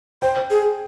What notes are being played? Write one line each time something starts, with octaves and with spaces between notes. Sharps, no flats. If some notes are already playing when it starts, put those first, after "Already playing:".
C5 G5
G#4